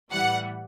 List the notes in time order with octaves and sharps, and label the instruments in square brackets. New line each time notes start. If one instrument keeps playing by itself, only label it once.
[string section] A2 E3 G3 F#5